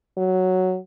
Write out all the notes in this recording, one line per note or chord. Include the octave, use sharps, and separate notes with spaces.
F#3